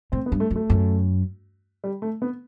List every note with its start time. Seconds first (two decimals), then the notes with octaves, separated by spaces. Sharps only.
0.12 A2 C4
0.26 B3
0.32 G2
0.40 A3
0.51 F#2
0.56 A3
0.70 F#2
1.84 G3
2.02 A3
2.22 B3